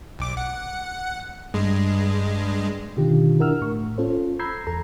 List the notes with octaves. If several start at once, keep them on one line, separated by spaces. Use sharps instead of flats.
B1 D6
F#5
G2 G#3
B2 D3 D#3 F4 G4
D4 E4 A#4 F#5 E6 F6
A2 C#6
C#4 F4 A4 C5
A#5 B5 E6 G6 G#6 C7
E2 A4 A#5